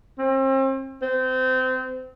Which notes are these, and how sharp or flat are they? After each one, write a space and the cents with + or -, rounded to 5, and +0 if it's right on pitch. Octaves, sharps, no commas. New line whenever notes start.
C4 +40
C4 -25